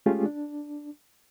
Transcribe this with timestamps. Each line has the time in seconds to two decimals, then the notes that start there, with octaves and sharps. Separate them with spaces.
0.06 G#3 A3 C#4 F4 G4 G#4
0.25 D4